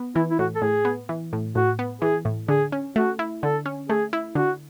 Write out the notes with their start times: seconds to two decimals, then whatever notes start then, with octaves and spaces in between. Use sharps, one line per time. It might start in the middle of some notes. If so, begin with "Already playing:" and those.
Already playing: B3
0.15 E3 E4
0.31 E4
0.39 A2 F#4
0.55 A4
0.62 A2 G#4
0.85 B3
1.09 E3
1.33 A2
1.55 A2 F#4
1.79 B3
2.02 E3 G#4
2.25 A2
2.48 D3 G#4
2.72 C#4
2.96 A3 F#4
3.19 E4
3.43 D3 A4
3.66 C#4
3.89 A3 G#4
4.13 E4
4.35 D3 F#4